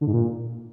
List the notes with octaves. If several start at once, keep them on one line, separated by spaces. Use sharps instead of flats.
D3
G#2
A#2